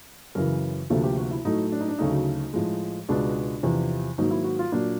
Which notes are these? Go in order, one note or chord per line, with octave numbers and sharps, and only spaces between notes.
F#2 C#3 E3 A#4
D2 C3 F3 A#3 A4
G4
F#4
E4
A2 F#3 A3 D#4
D4
D#4
D4
D2 C#3 F#3 A3 D#4
A2 F3 G#3
C#2 B2 G#3 D4
E2 C3 F3
G#2 D#3 F#3 A#3 D#4
E4
F#4
F4
A#2 F#3 A#3 D4